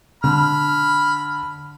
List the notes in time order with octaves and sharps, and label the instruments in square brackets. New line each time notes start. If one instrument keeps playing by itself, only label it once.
[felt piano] D3 [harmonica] B5 F6